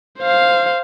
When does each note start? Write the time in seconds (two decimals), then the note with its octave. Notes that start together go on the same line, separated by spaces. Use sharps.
0.20 C5 F5